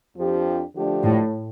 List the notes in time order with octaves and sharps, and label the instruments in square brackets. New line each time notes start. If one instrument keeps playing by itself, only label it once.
[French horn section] F2 F3 D4 G4
D3 F3 A3 D4 G4
[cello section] A2